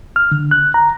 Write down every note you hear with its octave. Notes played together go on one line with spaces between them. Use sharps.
F6
D3
F#6
A#5